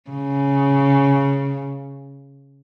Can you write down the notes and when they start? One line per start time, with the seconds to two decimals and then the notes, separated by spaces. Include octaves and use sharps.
0.10 C#3